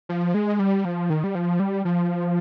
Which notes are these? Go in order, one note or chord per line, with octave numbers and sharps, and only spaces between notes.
F3
G#3
G3
F3
D#3
G3
F3
G3
F3